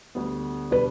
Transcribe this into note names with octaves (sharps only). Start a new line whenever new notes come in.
D2 D3 G3 B3
B2 G3 D4 B4